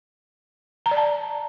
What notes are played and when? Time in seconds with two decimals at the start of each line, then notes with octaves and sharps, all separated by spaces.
0.86 A#5
0.91 D5
0.97 A5